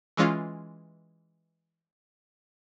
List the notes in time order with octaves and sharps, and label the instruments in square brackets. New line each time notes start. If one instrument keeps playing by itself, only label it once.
[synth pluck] E3 G#3 C#4 F4